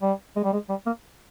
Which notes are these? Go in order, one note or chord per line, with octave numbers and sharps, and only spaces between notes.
G3
G#3
G3
G#3
G3
A#3